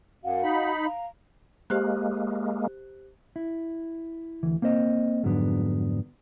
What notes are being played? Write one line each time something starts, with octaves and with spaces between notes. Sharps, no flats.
F#2 F#4 F5 F#5
D#4 B5
F5 A#5
G#3 A#3 G4 C5 F#6
E4
D2 E3
A#3 C4 C5 D#5
F2 G#2 D3 F#3 B3 D4